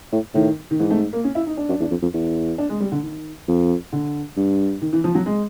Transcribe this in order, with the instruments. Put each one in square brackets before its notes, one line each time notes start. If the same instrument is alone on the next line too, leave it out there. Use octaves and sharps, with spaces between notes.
[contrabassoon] A2
[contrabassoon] A2 [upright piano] D#3
[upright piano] D#3
[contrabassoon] G#2 [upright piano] E3
[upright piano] A3
A#3
C#4
E4
D#4
D4
[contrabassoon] F#2
E2
F2
F2
E2
[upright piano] D4
G#3
G3
D3
D#3
[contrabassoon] F2
[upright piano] D3
[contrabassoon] G2
[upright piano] D#3
E3
F3
F#3
G#3